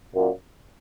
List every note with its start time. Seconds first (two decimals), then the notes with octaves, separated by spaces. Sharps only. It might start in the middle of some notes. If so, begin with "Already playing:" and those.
0.15 F#2 A#2